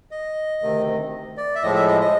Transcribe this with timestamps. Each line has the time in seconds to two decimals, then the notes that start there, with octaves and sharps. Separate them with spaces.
0.11 D#5
0.62 D2 C3 D#3
1.37 D5
1.55 E5
1.63 A2 F3 G#3 D#5
1.75 E5
1.88 D#5
2.01 D#5